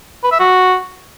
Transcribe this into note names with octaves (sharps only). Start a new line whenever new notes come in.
B4
E5
F#4